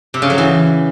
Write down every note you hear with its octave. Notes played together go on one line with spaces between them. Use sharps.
C3
C#3
F#3
E3